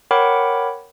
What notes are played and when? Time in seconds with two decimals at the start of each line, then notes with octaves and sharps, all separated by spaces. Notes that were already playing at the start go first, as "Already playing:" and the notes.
0.11 A#4 C#5 F#5 G5 B5 D6